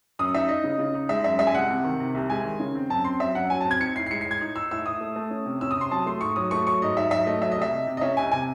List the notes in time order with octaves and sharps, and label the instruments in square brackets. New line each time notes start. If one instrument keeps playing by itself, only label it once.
[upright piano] F#2 D#6
D#4 E5
D#4 D#5
C#3
C#3
D#4
G#3 E5
F#2 E5
G#3 E5
G#5
C2 F#5
C3
D#3
C3
C2
G#3 G#5
D#3
C#3
C4
F#2 A5
C4 C6
F#3 E5
F#2 F#5
F#3 G#5
A5
C4
G#6
D#4 C#7
A2 C7
C7
G#3 C#7
C7
A2 G#6
D#4
D#4 E6
A2 E6
A2 D#6
A3
A3
C#4
C3
C#4 E6
D#6
C3 C6
F#3 A5
A3 C6
G#2 C#6
F#3 D#6
A3 C#6
F#3 C#6
G#2 D#5
G#2 E5
F#3 E5
A3 D#5
F#3 E5
D#5
C2
E5
C3
C3
D#5
C#4 E5
C2 G#5
C3 G#5